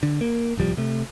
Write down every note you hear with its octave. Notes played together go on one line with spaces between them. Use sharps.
D3
A#3
D1 C2 F3 G3
C3 A3